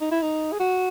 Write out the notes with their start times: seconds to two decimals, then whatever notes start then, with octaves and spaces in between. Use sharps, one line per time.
0.01 D#4
0.12 E4
0.22 D#4
0.52 G#4
0.59 F#4